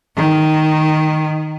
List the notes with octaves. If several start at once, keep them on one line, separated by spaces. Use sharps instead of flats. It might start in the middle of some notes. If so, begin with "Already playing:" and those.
D#3